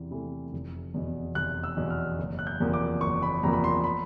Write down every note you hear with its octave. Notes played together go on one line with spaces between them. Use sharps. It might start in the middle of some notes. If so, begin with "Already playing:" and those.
Already playing: E2 C3 E3
C3 E3 A3
F1
E2 B2
F1 F#6
E6
E2 B2
F6
F#1
F#6
G6
E2 C3 F3 A#3
D6
F#1 C#6
B5
E2 C3 F3 A#3 A#5
B5
C6
B5